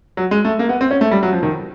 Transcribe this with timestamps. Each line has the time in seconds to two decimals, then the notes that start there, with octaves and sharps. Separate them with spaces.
0.17 F#3
0.31 G#3
0.45 A3
0.59 A#3
0.69 B3
0.81 C4
0.91 C#4
1.01 A3
1.11 G3
1.23 F#3
1.33 F3
1.43 D#3